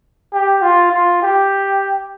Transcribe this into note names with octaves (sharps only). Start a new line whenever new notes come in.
G4
F4
F4
G4